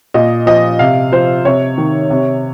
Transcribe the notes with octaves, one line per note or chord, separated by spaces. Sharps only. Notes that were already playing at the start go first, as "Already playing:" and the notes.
A#2 D#5
F3 D#5
C3 F5
F3 C5
C3 C#5
D#3
C3